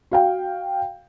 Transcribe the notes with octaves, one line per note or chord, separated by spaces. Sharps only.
F#4 F5 G5